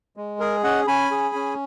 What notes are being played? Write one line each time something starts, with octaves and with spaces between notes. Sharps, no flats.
G#3
G#4 A#4
C#4 D#5 F#5
C#4 G#5 B5
G#4
C#4